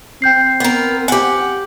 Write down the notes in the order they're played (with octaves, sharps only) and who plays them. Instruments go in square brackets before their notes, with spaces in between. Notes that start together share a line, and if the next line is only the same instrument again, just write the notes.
[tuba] C4 [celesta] G5 G6 C7
[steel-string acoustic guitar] B3 A#4
[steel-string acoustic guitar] G4 F#5 [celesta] G#5